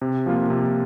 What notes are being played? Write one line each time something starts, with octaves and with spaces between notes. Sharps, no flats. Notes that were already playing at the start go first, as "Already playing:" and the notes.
C3
F3 A#3 F4
C3